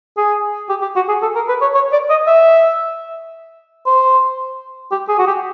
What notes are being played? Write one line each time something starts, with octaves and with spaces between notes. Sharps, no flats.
G#4
G4
G4
F#4
G#4
A4
A#4
B4
C#5
C#5
D5
D#5
E5
C5
G4
G#4
F#4
G4